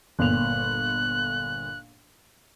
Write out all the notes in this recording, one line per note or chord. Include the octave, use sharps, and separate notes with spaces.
G1 A#2 F#6 F7